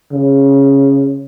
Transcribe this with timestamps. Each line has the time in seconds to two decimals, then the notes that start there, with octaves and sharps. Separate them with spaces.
0.13 C#3